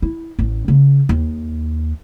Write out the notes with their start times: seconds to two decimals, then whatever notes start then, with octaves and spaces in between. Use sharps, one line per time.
0.02 E4
0.39 A1
0.68 C#3
1.09 D#2